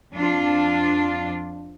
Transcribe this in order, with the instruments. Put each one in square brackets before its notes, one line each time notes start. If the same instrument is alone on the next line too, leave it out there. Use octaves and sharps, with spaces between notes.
[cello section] F2 D4 F4